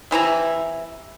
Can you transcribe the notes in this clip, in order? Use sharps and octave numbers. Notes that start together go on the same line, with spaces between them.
C3 E3 E4 A#5